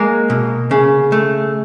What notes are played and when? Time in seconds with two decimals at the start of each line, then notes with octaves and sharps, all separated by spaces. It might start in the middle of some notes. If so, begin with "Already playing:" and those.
Already playing: G#3 A#3
0.30 B2
0.71 C#3
1.12 A3